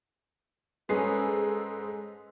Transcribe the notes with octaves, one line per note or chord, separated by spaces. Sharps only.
G#2 G#3 C#4 G#4 A4 B4 C7